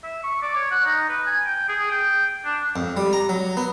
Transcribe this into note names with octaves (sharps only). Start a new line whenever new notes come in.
E5
C#6
D5
C#5
F#5
D#4
B4
G#5
G5
G#4
G5
D4
F2
G3
A#5
F#3
B3